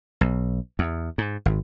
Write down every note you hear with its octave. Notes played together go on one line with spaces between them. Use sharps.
B1
E2
G#2
G#1